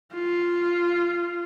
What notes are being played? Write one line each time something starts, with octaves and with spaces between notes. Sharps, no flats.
F4